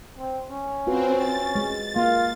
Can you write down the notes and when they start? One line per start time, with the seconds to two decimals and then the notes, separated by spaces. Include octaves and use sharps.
0.18 C4
0.50 C#4
0.87 C4 F4 F#4 B4
1.15 A6
1.55 G#3
1.96 A#3 F4